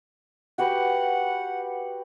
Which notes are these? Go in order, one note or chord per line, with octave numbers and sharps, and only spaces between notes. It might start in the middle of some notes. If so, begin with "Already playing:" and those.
F#4 G4 B4 F#5